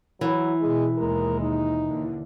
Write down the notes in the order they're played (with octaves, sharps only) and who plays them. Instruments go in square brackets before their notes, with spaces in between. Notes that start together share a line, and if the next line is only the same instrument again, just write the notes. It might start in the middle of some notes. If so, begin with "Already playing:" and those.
[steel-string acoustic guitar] E3 [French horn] F#3
[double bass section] B2 [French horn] G#3
[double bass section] D#2 B2 G#3 [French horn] A#4
[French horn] D#4
[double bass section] D#2 D3